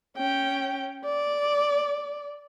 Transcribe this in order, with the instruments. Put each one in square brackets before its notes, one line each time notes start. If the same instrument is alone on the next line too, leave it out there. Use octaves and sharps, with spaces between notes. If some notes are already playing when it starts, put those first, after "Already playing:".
[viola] C#4 G5
D5